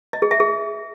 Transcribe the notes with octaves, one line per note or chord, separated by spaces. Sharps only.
D#5
G#4
E5
G#4